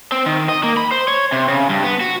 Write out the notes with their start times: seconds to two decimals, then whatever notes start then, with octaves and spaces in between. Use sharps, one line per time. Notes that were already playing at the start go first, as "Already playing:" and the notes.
0.12 C4
0.26 D#3
0.49 D#5
0.63 A#3
0.77 B5
0.91 C5
1.08 C#5
1.32 C3
1.48 C#3
1.69 G2
1.84 B3
2.00 F#4